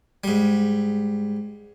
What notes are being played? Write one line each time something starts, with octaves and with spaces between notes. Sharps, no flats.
G#2 G3